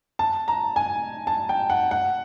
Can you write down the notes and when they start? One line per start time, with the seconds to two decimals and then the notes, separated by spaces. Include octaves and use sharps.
0.19 A5
0.48 A#5
0.76 G#5
1.27 A5
1.49 G5
1.70 F#5
1.91 F#5